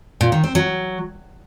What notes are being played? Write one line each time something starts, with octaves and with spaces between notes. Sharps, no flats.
A#2
D#3
C4
F#3